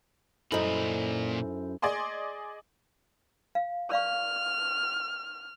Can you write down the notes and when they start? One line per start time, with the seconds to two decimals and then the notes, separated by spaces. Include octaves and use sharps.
0.52 F#2 A#2 D#4 E4 A4 C5 B5
1.82 G#4 D5 D#5 G#5 C6
3.55 F5
3.92 D5 F5 C#6 F6